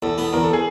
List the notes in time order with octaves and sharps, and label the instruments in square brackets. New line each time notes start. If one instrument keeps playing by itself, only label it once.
[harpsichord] E2 [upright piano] A4
[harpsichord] B3 [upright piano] A4
[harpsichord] E2 [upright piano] A#4
[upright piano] A4
G#4